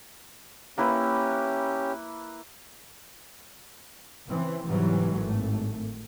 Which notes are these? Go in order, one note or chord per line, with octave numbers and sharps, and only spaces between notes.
A#3 C#4 E4 G4 B4
C#3 E3 C4
G#2 C3 E3 F#3 G3
G#1 A2 A3